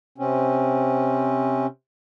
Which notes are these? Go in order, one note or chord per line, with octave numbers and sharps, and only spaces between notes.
C3 C4 C#4